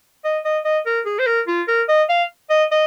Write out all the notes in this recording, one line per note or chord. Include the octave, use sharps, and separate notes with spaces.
D#5
D#5
D#5
A#4
G#4
C5
A#4
F4
A#4
D#5
F5
D#5
D#5